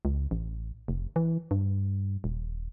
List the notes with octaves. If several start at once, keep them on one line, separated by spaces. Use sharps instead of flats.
C#2
A1
F1
E3
G2
D#1